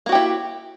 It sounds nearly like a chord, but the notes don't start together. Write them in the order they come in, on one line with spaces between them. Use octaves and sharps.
A#3 F#4 G4 E4